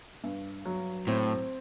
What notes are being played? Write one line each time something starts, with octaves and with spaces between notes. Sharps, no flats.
G2
F#3
A2 C4